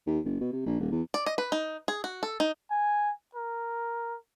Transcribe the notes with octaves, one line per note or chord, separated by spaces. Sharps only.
D#2
F#1
B2
C3
A#1
D#1
E2
D5
D#5
B4
D#4
G#4
F#4
A4
D#4
G#5
A#4